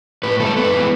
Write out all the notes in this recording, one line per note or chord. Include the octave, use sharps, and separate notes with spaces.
A2 B4
G#3 B3 A4
F#2 B4
E3 G#3 B3